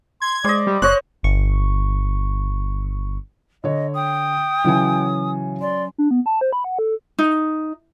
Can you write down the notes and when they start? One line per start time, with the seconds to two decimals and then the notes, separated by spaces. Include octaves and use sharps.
0.22 C6 G#6
0.45 G#3 C5 D5 D#5
0.67 G3
0.82 F#1 C5 C#5 D#5 F#6
1.23 G1 C#6
3.64 D3 C#5 D#5
3.95 G5 D#6
4.65 C#3 E3 F#3 C#4 G#5
5.61 D5 C6
5.98 D4
6.11 B3
6.26 A5
6.41 C5
6.53 B5
6.64 F#5
6.79 A4
7.19 D#4